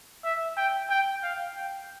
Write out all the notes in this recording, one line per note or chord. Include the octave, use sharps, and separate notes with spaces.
E5
G5
G5
F5
G5